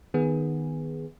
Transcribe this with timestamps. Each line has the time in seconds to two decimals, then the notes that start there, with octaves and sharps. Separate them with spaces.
0.14 D#3 B3 G#4